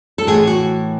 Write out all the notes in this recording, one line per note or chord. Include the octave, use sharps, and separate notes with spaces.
A4
A2 E3 G#4
F#4